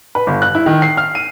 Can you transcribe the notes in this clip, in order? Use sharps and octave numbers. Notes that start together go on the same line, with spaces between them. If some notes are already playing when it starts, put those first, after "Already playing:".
B4
G1
F#6
E4
D#3
C7
F6
D#7